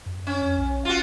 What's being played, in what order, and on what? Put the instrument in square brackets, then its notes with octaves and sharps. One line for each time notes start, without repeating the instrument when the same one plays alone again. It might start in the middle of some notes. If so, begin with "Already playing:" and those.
[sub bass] F#2
[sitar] C#4
[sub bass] F2
B1
[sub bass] G1 [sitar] F4 F#4